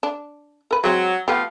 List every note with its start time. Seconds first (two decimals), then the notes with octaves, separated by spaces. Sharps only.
0.03 D4
0.71 A#4 B4
0.84 F#3 G#3 C4
1.28 F3 A3 B3 G4 F5